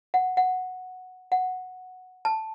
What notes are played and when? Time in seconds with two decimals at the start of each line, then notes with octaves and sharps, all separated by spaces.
0.14 F#5
0.37 F#5
1.32 F#5
2.25 A5